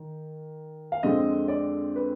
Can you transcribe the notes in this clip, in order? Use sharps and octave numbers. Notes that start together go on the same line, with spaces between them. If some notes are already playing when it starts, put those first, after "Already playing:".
Already playing: D#3
F5
F2 D3 G#3 C4 D#5
D5
B4